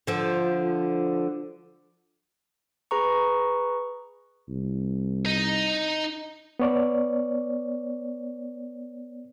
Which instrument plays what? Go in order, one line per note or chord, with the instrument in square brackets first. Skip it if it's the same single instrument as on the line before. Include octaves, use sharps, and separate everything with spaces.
[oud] D3 F3
[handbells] G#4 B4 A#5 C#6
[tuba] C2
[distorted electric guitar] D#4 D#5
[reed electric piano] B3 C#5 D5